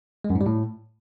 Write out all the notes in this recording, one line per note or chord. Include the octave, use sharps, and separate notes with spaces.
G#3
F#2
G#2
G3
A2